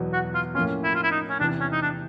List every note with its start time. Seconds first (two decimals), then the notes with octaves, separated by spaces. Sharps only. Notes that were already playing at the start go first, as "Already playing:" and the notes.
Already playing: E2 B2 F#3 B3
0.13 F#4
0.34 F4
0.55 A2 F3 A#3 C#4 F4
0.84 E4
0.95 F4
1.03 E4
1.11 D#4
1.29 C#4
1.39 E2 C3 E3 D4
1.60 C#4
1.72 D#4
1.82 D4